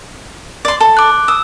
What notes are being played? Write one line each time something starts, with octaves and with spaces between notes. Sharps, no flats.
D5 C6
A4
D6 F#6
D#6 E6